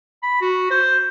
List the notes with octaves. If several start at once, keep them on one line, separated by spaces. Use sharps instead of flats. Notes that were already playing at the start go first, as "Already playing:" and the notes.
B5
F#4
C5